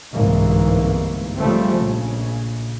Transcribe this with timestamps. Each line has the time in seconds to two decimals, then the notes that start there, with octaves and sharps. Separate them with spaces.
0.14 G1 C2 G#2 E3 A#3
1.38 C#3 F3 G3 A3 C4
1.83 A#1 C#3